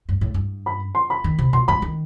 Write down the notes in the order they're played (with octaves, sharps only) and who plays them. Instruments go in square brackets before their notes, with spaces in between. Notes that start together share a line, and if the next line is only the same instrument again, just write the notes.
[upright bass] G2
A2
G2
[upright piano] B5
C6
B5
[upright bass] D#3
C3
[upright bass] B2 [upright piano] C6
[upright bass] G2 [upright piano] B5
[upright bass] D#3